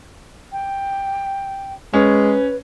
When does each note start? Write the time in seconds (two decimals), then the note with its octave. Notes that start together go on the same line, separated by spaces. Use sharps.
0.52 G5
1.94 G#3 C#4 B4